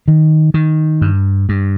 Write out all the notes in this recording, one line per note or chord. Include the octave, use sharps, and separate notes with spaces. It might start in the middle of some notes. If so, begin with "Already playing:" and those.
D#3
D#3
G2
G2